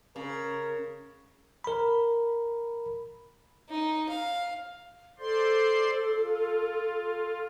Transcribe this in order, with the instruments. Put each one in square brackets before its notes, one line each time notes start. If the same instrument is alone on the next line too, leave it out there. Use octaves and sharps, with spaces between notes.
[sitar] C#3 [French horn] A#4
[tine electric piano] A#4 B5
[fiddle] D#4
F5
[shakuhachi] A4 [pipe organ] C5 D5 C6
[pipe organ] F4